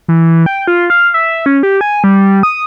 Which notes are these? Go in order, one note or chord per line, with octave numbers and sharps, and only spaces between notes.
E3
G5
F4
F5
E5
C#4
G4
G#5
G3
D#6